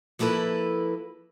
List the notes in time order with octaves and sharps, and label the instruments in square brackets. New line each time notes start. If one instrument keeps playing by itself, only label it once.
[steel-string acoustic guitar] F3 A#3 E4 A4 B4